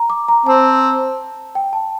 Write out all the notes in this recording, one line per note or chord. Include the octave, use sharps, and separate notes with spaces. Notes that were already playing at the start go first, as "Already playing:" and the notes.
Already playing: A#5
D6
A#5
C4 A5
G5
A5